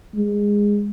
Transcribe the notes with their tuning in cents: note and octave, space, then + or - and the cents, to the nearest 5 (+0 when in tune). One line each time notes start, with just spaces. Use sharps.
G#3 -15